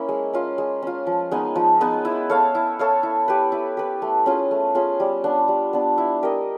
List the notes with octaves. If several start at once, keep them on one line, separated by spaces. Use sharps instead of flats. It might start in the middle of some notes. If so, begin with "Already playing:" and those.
Already playing: A#3 C#4 E4
G#3
C#4 F4
G#3
C#4 F4
F3
G#3 B3 D#4
F3
G#3 B3 D#4
E4
A4 C#5 F5
E4
A4 C#5 F5
E4
G4 B4
E4
G4 B4
A3
C#4 F4 G#4
A3
C#4 F4 G#4
G3
B3 D4
G3
B3 D4
E4
G4 A#4 D#5